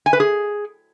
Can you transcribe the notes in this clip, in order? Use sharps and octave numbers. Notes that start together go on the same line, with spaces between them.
G#5
B4
G#4